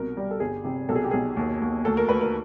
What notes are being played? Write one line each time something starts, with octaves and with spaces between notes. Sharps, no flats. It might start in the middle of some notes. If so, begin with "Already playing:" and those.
Already playing: C2 B2 A#4
G3
A4
G1 G#4
C3 G4
B1 A4
G#4
G4
B1 G#4
D#2
D#2
D2 A4
A#4
D2 B4
A#4